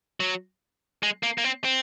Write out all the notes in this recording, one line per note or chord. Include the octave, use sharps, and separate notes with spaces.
F#3
G#3
A#3
A#3
C4
C4